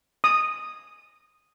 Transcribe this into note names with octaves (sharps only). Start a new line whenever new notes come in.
D#6